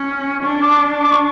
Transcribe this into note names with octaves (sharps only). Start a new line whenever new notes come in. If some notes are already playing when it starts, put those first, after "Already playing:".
Already playing: C#4
D4 C#6
D6
D6
C#6